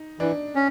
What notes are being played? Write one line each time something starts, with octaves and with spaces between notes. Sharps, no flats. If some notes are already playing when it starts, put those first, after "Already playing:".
Already playing: D#4
E3 D4
C#4